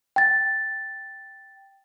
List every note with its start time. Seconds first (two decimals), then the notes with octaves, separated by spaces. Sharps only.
0.16 G5 A6